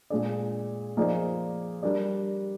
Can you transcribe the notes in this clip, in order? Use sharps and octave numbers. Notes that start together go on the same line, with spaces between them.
A#2 G#3 D4 G#4 D5
F3 A#3 D#4 G#4 D5
G3 D4 G4 A#4 D5